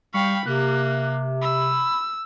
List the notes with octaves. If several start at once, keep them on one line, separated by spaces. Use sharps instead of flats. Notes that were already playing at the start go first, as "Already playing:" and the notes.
G3 F5 G5 B5 C#6
C3 A#3 F#6
B5 E6